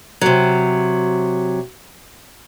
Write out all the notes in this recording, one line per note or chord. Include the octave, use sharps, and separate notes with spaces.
C3 F#3